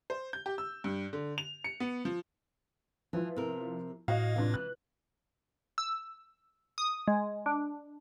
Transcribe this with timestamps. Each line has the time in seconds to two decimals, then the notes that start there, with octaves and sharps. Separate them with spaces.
0.10 C5
0.33 G6
0.46 G4
0.58 E6
0.84 G2
1.13 D3
1.38 F7
1.64 C#7
1.80 B3
2.05 F3
3.13 E3 F3 E4 F4
3.36 C3 A#4
4.08 A2 F#4 D#5 F5
4.36 C3 E3 D4 F4
4.54 F#6
5.78 E6
6.78 D#6
7.08 G#3
7.46 D4